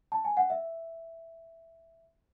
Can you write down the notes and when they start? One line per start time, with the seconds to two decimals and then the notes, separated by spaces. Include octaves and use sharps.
0.12 A5
0.25 G#5
0.37 F#5
0.50 E5